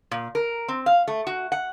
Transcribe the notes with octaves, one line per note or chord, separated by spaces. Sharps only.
A#2
A#4
C4
F5
A3
F#4
F#5